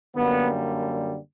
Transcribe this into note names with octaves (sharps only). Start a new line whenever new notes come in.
F#2 D3 G3 A#3 B3